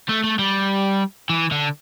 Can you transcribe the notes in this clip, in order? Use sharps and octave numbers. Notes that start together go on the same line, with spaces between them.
A3
A3
G3
E3
D3